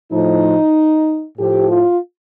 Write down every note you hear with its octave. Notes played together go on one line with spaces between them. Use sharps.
A2 F3 D#4
A2 F3 G4
F4